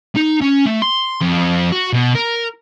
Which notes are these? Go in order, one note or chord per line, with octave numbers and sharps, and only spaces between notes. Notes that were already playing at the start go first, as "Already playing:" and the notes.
D#4
C#4
A3
C6
F2
F#4
B2
A#4